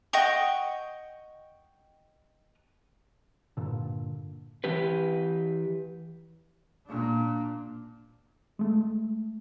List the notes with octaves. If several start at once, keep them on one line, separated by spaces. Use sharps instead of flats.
D#5 F#5 G5 C#6
G2 A#2 D3
E3 G4 B4
A#2 D4
G#3 A3